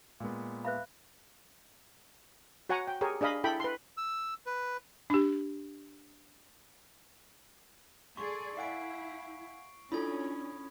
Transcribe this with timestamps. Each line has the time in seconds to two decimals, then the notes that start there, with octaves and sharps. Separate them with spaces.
0.20 A#2 G#3 B3
0.65 B4 E5 F5 B5 F#6
2.69 F#4 C#5 F#5 G#5 A#5 C#6
2.88 G5
3.01 G4 G#4 A#4 C#5
3.21 D4 G#4 D#5 F5 B5
3.44 E4 A4 G5 B5
3.60 B4 C6
3.97 E6
4.46 B4
5.10 D4 G4
8.17 G#4 A4 D5 C6 C#6
8.57 E4 F5 F#5 G#5 C7 D7
9.92 C#4 D4 E4 F4 A4 B5 D#6 G#6